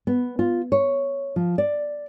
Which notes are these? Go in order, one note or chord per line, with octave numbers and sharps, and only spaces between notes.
B3
F4
C#5
F3
D5